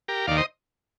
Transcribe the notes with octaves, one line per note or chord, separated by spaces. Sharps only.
G4 A#4
D#2 D#3 D5 F5
C5 D#5